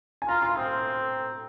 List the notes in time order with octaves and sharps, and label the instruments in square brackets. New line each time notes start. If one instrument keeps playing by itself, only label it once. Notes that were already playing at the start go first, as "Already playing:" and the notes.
[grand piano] G#5
[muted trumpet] F4 [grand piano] A#5
[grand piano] C6
[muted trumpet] C4 [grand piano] D#6